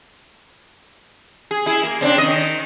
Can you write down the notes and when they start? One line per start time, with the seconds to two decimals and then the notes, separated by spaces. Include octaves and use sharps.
1.51 G#4
1.66 E4 G#4
1.83 A#3
2.01 C#3 C4 D4
2.18 D#3 D#5